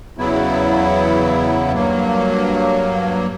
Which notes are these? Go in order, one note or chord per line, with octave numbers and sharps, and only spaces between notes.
E2 C#3 F#3 B3 E4
G2 F#3 A#3